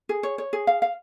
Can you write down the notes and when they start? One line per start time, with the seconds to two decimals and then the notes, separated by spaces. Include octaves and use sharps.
0.09 G#4
0.23 C#5
0.38 C#5
0.53 G#4
0.67 F5
0.82 F5